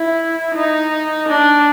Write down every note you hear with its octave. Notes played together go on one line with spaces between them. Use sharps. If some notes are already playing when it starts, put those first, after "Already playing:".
Already playing: E4
D#4
D4